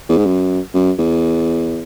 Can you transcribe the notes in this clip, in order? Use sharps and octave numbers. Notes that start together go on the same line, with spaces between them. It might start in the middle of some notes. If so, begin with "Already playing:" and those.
E2
G#2
F#2
F#2
E2